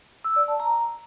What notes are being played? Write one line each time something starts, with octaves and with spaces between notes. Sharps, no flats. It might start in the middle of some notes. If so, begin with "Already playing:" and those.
E6
D5
A5
A#5